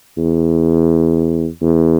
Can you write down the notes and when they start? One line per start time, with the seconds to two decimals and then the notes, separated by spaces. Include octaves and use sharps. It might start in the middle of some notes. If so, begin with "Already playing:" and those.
0.18 E2
1.62 E2